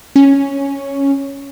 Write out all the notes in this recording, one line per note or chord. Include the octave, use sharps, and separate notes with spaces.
C#4